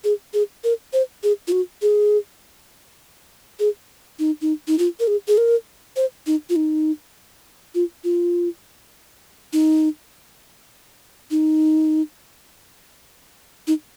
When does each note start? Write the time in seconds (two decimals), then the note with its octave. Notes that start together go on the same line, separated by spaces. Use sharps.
0.04 G#4
0.34 G#4
0.64 A#4
0.93 C5
1.23 G#4
1.48 F4
1.52 F#4
1.82 G#4
3.60 G#4
4.19 D#4
4.42 D#4
4.68 D#4
4.79 F4
5.00 A#4
5.07 G#4
5.28 G#4
5.38 A#4
5.96 C5
6.27 D#4
6.50 F4
6.56 D#4
7.75 F4
8.04 F4
9.53 D#4
11.31 D#4
13.68 D#4